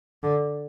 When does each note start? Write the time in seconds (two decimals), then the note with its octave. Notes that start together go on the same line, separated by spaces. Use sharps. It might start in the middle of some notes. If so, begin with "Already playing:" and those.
0.23 D3